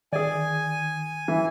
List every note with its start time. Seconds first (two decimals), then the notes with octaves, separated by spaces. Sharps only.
0.13 D#3 G#4 D5 G#5
1.28 E3